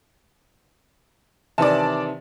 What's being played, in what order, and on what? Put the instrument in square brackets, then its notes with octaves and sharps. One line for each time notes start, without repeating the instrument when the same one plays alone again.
[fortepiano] C3 D#3 E3 [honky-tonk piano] D5 A5